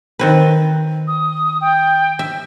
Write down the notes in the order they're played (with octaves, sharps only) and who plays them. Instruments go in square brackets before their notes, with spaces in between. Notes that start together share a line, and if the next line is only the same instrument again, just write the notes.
[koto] D#3 C4 B4
[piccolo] D#6
G5
[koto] E5